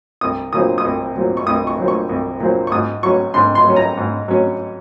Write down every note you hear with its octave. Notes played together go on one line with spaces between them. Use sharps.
C2 D#6
A#2 F#3 C4 D#6
D#6
C2
A#2 F#3 C4
C#6
C2 D#6
C#6
A#2 F#3 C4
C#6
C2
A#2 F#3 C4
C#6
G#2 D#6
F#3 C#4 C#6
G#2 C6
C6
F#3 C#4
A#5
G#2
F#3 C#4